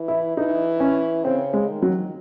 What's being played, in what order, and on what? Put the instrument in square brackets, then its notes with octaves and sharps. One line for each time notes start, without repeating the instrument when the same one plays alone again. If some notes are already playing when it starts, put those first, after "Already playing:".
Already playing: [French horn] E3
[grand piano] E4
[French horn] E3 [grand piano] D#4
[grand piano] C#4
[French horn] C#3 [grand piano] C4
[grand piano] G#3
[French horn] D#3
[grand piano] F#3